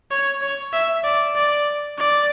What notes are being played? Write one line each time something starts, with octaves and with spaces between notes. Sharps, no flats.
C#5
C#5
E5
D5
D5
D5